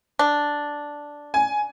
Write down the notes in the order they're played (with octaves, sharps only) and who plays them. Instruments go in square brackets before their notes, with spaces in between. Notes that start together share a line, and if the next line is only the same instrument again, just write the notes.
[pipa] D4
[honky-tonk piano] G#5